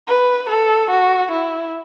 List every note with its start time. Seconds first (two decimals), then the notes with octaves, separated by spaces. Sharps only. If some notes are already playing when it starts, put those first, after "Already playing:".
0.08 B4
0.49 A4
0.90 F#4
1.31 E4